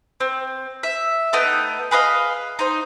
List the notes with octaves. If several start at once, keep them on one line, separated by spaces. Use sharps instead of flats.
C4
E5
A3 B3 D#4 G5
G#4 B4 D#5 F5
D#4 C5